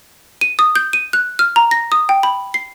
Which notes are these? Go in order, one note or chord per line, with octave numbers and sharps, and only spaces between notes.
D#7
D#6
G6
D#7
F#6
F6
A#5
A#6
D#6
G5
B5
C7